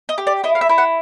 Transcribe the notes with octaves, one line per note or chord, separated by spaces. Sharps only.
D#5
G4
D5
E4 D#5
F5
E5
E4
F#5